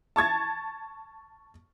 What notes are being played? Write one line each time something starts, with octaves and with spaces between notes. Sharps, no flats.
A5 C#6 G#6 A6